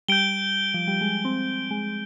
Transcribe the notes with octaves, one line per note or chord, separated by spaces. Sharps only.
G3 G6 D7 G7
F3
G3
G#3
C4
G#3